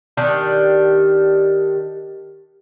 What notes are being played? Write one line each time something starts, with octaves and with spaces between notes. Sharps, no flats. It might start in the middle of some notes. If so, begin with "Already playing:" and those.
D#3 D4 G4